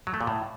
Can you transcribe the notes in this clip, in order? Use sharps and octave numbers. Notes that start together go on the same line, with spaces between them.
F#3
A3
A#2
A2